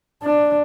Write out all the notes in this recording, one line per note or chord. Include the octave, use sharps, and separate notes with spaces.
D4